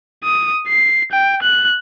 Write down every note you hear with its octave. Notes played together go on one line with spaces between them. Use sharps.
D#6
C7
G5
F#6